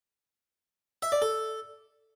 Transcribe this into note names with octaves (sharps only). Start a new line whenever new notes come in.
E5
D5
A4